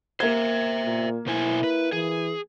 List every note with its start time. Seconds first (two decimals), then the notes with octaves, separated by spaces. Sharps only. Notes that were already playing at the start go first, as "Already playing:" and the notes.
0.20 A#3 C5 E5 G#6
0.84 A#2
1.26 B2 E4 C5 G#5
1.64 B4
1.92 E3 G#4